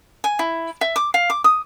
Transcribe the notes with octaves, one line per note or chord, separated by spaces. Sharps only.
G#5
E4
E5
D6
F5
D6
D#6